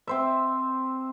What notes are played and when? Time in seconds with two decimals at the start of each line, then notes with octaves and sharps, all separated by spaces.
0.07 C4 C5 E5